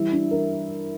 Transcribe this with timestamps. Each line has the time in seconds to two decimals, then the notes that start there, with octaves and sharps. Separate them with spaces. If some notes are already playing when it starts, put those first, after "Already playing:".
Already playing: E3 G3 E4 E5
0.12 D4
0.31 E3 A#4